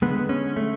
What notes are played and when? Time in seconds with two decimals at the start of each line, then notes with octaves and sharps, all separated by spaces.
0.02 D3 G#3 B3
0.29 C#4
0.56 A3